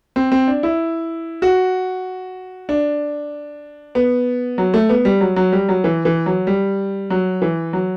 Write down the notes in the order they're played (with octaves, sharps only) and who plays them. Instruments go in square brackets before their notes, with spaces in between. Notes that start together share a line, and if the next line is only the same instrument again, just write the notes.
[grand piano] C4
C4
D4
E4
F#4
D4
B3
F#3
A3
B3
G3
F#3
F#3
G3
F#3
E3
E3
F#3
G3
F#3
E3
F#3